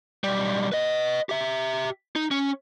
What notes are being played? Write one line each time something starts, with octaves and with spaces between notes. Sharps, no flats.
B1 G3
B4 D#5
G4 E5
D#4
C#4